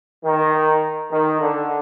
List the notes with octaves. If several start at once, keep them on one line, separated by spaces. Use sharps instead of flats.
D#3
D#3
D3